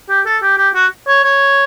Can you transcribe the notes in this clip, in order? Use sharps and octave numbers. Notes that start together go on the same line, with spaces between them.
G4
A4
G4
G4
F#4
C#5
C#5